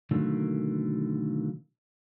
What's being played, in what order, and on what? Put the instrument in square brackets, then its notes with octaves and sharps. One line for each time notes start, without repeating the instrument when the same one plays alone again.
[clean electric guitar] B2 D3 D#3 F#3 A3 A#3